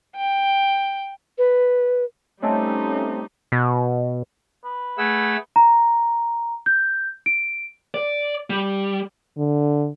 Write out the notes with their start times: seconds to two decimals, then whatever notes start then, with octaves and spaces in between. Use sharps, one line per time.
0.16 G5
1.38 B4
2.42 G3 A3 C4 C#4 D#4 C#5 D#5 A5
3.52 B2
4.64 B4
4.98 A3 G#4 F#5 E6
5.56 A#5
6.66 G6
7.26 D7
7.94 D5
8.50 G3
9.38 D3